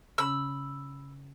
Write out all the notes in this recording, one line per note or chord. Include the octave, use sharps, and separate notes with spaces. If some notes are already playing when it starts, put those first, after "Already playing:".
C#3 C#4 B5 E6